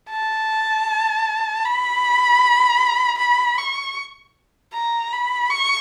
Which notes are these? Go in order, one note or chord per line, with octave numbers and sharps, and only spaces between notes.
A5
B5
B5
C#6
A#5
B5
C#6